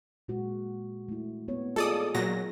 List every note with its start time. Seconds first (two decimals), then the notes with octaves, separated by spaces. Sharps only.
0.28 A#2 G#3 F#4
1.08 A3 E4
1.48 B3 C4 C#5
1.76 F4 G#4 A4 D5 D#5 D#6
2.15 A#2 F#3 A#6